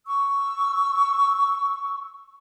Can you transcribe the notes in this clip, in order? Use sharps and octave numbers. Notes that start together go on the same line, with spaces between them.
C#6 E6